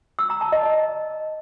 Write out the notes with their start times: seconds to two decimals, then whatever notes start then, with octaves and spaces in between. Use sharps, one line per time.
0.19 E6
0.30 A#5
0.41 A5
0.52 D#5